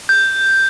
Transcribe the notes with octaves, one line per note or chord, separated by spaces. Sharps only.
G6